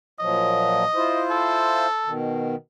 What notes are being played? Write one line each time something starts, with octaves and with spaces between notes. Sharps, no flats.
A#2 F3 F#3 D#5
E4 F4 C5
A4
B2 D#3